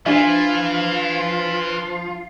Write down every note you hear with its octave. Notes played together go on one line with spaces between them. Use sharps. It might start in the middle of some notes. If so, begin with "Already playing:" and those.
E3 F3 D4 F4 E5